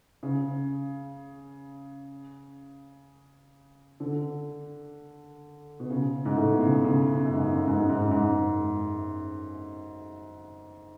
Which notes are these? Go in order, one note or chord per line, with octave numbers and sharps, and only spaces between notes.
C#3
D3
B2
C#3
G#2
A2
B2
C#3
C#3
F#2
G#2
F#2
G#2
F#2
G#2
F#2
G#2